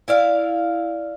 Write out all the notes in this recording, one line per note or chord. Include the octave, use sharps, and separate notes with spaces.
E4 D5 F5